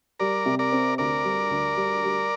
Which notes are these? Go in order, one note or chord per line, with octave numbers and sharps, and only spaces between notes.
G3 A#4 D5
C3
A#4 D5
C4
D2 A#4 D5
G3
D2
G3
G3